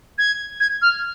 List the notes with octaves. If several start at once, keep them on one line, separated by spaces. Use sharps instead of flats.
G#6
G#6
F6